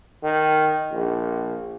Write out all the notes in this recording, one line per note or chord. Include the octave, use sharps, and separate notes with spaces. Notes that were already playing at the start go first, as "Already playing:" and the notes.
D#3
A#1